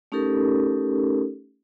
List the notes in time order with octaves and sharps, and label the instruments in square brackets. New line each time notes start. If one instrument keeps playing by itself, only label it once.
[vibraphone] A3 C#4 D#4 G4 A4 A#4